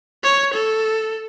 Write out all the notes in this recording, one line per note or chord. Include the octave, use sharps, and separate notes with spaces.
C#5
A4